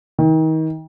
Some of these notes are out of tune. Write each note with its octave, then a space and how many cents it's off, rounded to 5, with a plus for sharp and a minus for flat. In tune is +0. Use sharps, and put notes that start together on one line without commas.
D#3 +35